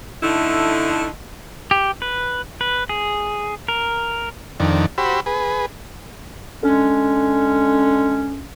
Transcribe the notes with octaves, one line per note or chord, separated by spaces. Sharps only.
D3 A3 D#4 E4
G4
B4
B4
G#4
A#4
F2 D#3 D4
F#4 G4 C5 B5 E6
G#4 B4
D3 G#3 C#4